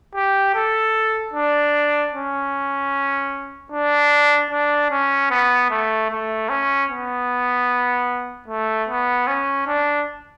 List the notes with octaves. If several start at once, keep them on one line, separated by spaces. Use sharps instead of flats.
G4
A4
D4
C#4
D4
D4
C#4
B3
A3
A3
C#4
B3
A3
B3
C#4
D4